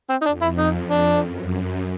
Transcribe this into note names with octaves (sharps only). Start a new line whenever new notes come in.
C4
D#4
F2 D4
E4
D#4
F2 D4
F#2